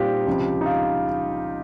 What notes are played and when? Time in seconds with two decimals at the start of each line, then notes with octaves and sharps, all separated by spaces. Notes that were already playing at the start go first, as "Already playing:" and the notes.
Already playing: A#2 G3 C4 D#4 F4 G4
0.27 C#2 C3 F3
0.61 D#4
0.66 F4